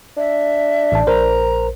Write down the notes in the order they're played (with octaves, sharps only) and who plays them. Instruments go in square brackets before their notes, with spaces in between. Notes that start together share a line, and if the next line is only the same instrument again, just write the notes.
[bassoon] D4 [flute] E5
[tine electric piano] A1 A5
[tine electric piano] A#1 A#4 C5 [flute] A#5